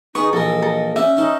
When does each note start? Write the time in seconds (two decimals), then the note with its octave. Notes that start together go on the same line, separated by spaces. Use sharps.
0.15 D#3 D#4 G#4 B4 C#6
0.33 A#1 E3 A#3 A4 D#5
0.62 A4
0.96 C#4 D#4 D5 E5
1.17 C#4 D#4 A4